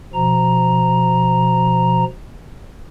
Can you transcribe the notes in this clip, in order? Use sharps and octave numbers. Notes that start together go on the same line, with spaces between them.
B2 F3 A#5